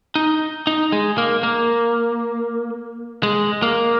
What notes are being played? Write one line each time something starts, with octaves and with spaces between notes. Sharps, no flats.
D#4
D#4
G#3
A#3
A#3
G#3
A#3